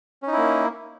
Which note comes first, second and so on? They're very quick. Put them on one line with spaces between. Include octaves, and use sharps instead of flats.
C#4 D#4 E4 A#3